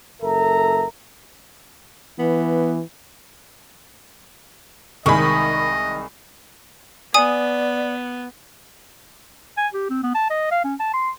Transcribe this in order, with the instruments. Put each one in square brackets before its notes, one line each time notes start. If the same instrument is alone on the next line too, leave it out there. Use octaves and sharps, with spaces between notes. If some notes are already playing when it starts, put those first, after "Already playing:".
[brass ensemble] F#1 A4 A#4 E5 A#5
[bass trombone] E3 [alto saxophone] B3
[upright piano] C2 G#3 G#5 [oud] D#3 [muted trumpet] D#5 [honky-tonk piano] B5 C#6
[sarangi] B3 [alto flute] D5 [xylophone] G#5 D#6
[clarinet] G#5
G4
C4
B3
A5
D#5
F5
C#4
A5
C6